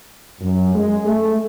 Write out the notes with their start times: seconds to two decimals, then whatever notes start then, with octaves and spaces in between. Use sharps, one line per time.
0.41 F#2
0.75 G#3
1.05 A3